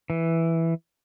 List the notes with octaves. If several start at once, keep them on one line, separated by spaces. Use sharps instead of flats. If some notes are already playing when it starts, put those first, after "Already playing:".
E3